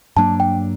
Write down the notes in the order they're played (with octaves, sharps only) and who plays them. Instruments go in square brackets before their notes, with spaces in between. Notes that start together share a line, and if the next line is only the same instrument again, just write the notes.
[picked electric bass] G2 F#3 A#3 D4 [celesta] A5
[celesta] G5